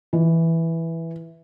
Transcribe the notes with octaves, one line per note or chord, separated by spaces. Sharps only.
E3